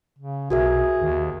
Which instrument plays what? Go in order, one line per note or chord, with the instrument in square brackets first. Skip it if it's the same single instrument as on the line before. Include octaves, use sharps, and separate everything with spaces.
[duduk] C#3
[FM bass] B1 [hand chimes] F#4 A#4 E5 [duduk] G#4
[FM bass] D#2